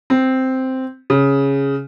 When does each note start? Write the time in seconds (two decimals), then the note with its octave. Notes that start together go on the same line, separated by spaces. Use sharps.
0.10 C4
1.10 C#3